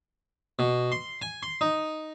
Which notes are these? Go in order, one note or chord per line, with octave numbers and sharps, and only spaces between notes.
B2
C6
G#5
C6
D#4